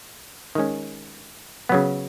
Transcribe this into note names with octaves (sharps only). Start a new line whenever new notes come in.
D#3 G#3 C#4
C#3 F#3 B3